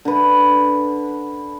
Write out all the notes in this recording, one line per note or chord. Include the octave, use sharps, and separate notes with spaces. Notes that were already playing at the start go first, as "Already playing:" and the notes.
D3 B4